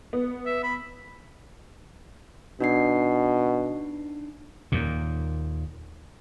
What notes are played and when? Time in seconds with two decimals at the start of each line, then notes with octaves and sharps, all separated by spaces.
0.13 B3
0.46 E5
0.63 B5
2.60 B2 D4 D#4 C7
4.72 D#2 A#2